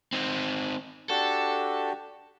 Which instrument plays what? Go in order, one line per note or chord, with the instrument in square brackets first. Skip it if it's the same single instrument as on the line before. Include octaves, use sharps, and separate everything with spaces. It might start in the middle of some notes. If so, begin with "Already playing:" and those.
[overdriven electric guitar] C4 D#4
[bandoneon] D4 F#4 G4 [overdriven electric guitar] A4